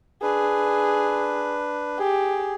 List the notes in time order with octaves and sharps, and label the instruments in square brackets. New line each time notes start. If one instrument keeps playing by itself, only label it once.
[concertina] D4 B4 [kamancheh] G#4
[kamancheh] G4 [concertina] G#4